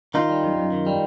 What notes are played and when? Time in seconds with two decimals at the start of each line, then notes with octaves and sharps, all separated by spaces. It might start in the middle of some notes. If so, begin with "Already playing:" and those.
0.14 D#3 D#4 F4
0.29 G3
0.43 F#2
0.58 F#2
0.72 D#3
0.87 G3